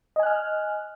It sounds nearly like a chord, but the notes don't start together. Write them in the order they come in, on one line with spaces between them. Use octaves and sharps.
D#5 G#5 F#6 F6